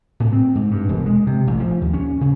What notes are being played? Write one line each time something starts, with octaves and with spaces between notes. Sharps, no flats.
A2
C4
G#2
G2
E1
G#3
C3
A1
F3
D#2
C#4
C#3